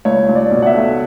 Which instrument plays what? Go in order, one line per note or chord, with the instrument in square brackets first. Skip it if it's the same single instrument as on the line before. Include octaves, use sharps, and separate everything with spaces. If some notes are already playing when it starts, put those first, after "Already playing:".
[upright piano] C#2 C#5
C#2
D5
B2
F#5
E5
A3